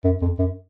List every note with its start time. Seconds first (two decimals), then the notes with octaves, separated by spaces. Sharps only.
0.04 F#2
0.21 F2
0.38 F#2